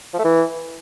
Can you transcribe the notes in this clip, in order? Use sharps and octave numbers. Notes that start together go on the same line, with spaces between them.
F3
A3
E3